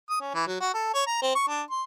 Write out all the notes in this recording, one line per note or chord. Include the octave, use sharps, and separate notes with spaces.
D#6
C#4
E3
F#3
F#4
A4
C#5
A#5
C4
C#6
D4
C6